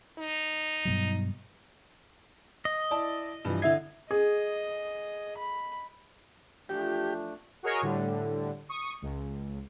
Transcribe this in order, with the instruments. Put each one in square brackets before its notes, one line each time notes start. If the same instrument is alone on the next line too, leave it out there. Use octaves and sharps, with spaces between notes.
[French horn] D#4
[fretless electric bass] G2 B2 F#3
[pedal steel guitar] D#5
[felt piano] E4 D5 A5
G2 E3 F3
[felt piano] D3 C7 [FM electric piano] E4 E5 G#6
[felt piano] G#4 [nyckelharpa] D#5
[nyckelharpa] B5
[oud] E3 F3 F4 [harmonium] A3 D4 [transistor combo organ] G4
[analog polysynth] F#4 G#4 A#4 C#5 D#5
A2 D3 G3
C#6 D#6
C#2